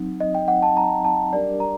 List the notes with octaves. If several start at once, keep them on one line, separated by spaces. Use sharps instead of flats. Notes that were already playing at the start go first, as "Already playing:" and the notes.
Already playing: F#3 C4 D#4
D#5
G5
F#5
A5
A#5
A5
G3 D4 G4 A#4 D5
A#5